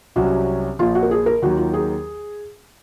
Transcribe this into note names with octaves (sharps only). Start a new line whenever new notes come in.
C2 C3 F#3 C#4 F#4
A#1 A#2 F3 F4
F#4
A#4
G#4
A#4
D#2 D#3 F#3 F#4
F4
G#4